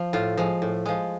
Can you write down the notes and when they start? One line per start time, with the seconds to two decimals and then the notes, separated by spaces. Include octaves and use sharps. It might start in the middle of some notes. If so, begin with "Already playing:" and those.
Already playing: F3
0.13 A2 F4
0.37 F3 G#3
0.62 A2
0.86 F3 G#3